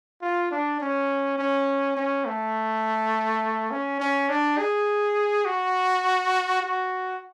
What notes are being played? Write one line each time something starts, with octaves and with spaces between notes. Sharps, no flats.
F4
D4
C#4
C#4
C#4
A3
C#4
C#4
D4
G#4
F#4
F#4